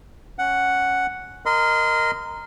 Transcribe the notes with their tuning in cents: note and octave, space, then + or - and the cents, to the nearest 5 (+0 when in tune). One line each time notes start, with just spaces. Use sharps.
C#4 +0 F#5 +0
A#4 +0 D#5 +0 C6 -30